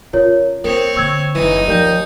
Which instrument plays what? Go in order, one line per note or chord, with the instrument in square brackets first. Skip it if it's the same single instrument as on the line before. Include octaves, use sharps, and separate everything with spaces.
[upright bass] C#3 [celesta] F4 A#4 C#5
[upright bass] A#3 [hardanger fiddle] C4 C#5 [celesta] A#4
[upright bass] D3 A#3 [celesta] C#6 E6 G#6
[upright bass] F#1 [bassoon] E3 [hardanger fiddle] D#4 D#6
[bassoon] D#2 [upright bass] F3 A3 [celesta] D5 G6